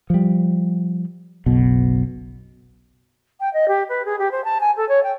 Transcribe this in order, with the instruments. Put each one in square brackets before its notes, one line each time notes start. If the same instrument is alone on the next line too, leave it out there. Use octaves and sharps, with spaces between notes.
[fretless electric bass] F3 G3
F#1 B1 B2
[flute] G5
D#5
G4
B4
G#4
G4
C5
A5
G#5
A4
C#5
G5